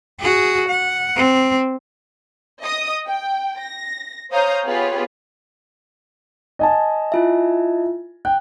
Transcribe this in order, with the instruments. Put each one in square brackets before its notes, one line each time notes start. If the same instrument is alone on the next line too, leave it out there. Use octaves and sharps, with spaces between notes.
[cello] F#4 G#4
F#5
C4
[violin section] D#5 D#6
G5
A#6
C5 C#5 F5 A#5 D#6 G6
B3 F4 G4 G#4 B4 C#5
[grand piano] D#5 G#5 A5
[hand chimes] E4 F4 E5
[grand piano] G5 [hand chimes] F#6